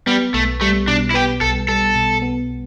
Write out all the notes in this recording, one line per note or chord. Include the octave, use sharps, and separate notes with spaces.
G3 B3
B1 A3
G3 A3
B2 D4
E4
B3 G4
B1 A4
G3 A4
B2
B3